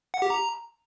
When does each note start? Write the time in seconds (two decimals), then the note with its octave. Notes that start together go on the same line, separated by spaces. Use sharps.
0.14 F#5
0.22 G4
0.30 A#5